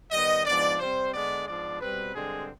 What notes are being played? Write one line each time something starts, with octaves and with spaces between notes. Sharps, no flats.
D#3 G3 B3 D#5
G#2 F3 B3 D4 D5
C3 G3 C4 C5
D3 G#3 B3 D4 D5
G#2 F3 B3 D4 D5
B2 G3 C4 B4
G2 D3 G#3 C4 G#4